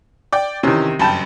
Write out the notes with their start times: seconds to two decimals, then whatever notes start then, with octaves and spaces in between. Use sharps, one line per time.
0.33 D5 G5
0.63 C3 D#3 E3 C#4
0.99 F#1 G2 G5 A5 B5